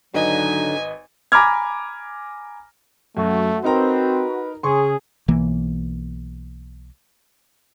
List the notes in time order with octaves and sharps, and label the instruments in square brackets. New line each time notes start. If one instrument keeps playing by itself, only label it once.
[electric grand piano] G#1 B4 D#5 [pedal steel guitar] D3 [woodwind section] F#3 D#4 [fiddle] G#5
[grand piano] G#5 A#5 B5 D6 F6 G#6
[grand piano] F#2 [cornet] A3 [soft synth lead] F#4
[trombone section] C4 [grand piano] D#4 A#4 A#5 [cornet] B4
[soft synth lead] C#3 [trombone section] C#4 G#4 [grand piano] C6 C#6
[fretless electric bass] B1 E3 A#3